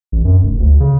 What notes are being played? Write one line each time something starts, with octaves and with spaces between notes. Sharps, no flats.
A1
F#2
F1
D2
C#3